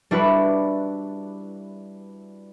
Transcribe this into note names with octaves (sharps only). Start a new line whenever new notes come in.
G3 D4 E4 F#4 B4